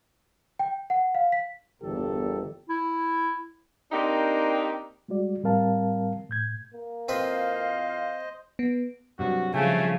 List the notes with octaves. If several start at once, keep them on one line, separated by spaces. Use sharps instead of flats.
G5
F#5
F5
B6
G1 E2 A#2 G4 A4
E4
A#3 C4 D4 D#4 G4 A#4
G3 G#3 F#4 D5
A2 G3 C4 A#4 F5 A5
A2 G6 G#6
A#3
F2 A2 C4 B4 C5 D#5 F5
B3
G2 C3 F#3 F#4
C#3 F3 A3 G#5